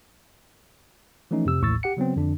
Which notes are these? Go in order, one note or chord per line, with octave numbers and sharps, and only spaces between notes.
E3 F3 A3 C#4 D#4
F2 C3 E6
A1 D#2 A2 C#6 E6 A6
G4 F#5 C#7
C#3 F#3 B3 C4
F2 D3 D4